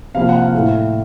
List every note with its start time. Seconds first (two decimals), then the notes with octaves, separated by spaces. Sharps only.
0.15 C3 F3 A#3 F5
0.29 F#5
0.41 F5
0.54 A2 A3